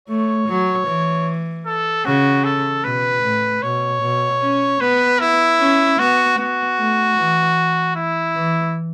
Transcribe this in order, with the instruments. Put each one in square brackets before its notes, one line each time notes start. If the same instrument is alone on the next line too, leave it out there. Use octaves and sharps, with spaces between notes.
[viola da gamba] A3 [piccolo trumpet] C#5
[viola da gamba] F#3
E3
[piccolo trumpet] A4
[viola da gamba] C#3 [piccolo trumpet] F#4
[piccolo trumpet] A4
[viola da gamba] B2 [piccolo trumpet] B4
[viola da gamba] A2
[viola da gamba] B2 [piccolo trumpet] C#5
[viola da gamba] B2
C#4
[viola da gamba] B3 [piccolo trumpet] B4
[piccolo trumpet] E4
[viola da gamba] C#4
[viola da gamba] B3 [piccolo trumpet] F#4
[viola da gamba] B3 [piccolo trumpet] F#4
[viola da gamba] A3
E3
[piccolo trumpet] E4
[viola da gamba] E3